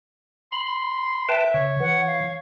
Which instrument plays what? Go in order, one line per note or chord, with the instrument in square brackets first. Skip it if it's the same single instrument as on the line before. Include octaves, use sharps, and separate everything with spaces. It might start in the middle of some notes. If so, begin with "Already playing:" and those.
[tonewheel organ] B5 [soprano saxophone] C6
[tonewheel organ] B4 G5 A5 [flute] E5
[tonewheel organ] C#3 [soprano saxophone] C#5
[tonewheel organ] E3 [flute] F#5
[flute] F5